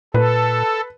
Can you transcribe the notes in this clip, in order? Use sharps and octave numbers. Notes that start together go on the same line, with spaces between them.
A#2 A4 B4